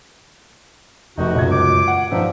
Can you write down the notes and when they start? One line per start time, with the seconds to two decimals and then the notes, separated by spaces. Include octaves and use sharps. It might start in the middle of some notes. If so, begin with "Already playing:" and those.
1.18 F1 C3 D#4 F#4
1.35 C#2 F#2 G#6
1.51 D6
1.88 F#5
2.11 G2 F3 D#4 E5